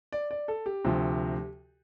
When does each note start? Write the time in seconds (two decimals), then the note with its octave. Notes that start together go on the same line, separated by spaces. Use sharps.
0.12 D5
0.31 D5
0.48 A4
0.66 G4
0.84 D2 C3 F3